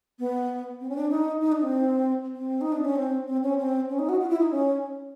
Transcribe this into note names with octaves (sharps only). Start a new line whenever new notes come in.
B3
C4
C#4
D4
D#4
D#4
D4
C4
C4
D#4
D4
C#4
C4
C4
C#4
C4
C#4
D#4
F#4
F4
E4
D#4
C#4